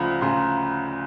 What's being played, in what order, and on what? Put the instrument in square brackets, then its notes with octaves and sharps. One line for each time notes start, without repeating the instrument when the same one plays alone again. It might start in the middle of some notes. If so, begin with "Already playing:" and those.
Already playing: [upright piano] D2 C#3 F3 A#5 B5
D2 C#3 F3 C6